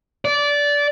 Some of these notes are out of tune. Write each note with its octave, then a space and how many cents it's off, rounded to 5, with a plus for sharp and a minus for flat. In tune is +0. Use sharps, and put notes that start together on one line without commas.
D5 -20